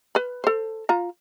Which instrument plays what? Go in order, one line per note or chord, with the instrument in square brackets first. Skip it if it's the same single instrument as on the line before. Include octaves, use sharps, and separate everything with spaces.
[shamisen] B4 B5
A4 C5
F4 A#5